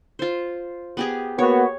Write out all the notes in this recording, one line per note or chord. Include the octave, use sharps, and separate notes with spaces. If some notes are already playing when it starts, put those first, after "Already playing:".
F4 C5
B3 G4 G#4
A#3 B3 F#4 C#5